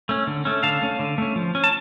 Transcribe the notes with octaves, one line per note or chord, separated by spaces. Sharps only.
A3 C#4
D3
A3 C#4
D3 F5 A5
A3 C#4
D3
A3 C#4
F3
C#4
A5